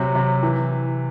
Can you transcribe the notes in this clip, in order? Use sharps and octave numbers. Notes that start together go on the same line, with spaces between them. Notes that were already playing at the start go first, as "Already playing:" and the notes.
Already playing: C3 F#3
C3
E3